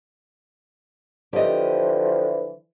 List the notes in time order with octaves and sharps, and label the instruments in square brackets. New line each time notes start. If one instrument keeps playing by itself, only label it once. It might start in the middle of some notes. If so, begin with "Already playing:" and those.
[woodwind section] D3 E3 F3 [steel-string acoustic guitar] G4 D#5